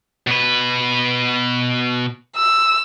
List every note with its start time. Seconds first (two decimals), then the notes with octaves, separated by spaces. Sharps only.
0.27 B2 B4
2.37 E6